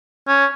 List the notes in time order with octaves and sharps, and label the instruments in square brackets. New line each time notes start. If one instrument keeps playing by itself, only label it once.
[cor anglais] C#4